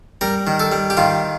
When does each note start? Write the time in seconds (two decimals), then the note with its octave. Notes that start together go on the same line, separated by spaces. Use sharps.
0.21 G3 A#4
0.47 D#3
0.60 A4
0.72 G3
0.90 G4
0.97 D#3 F4